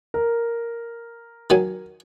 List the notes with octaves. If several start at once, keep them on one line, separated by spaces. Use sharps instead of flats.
A#4
D#3 F#3 G#5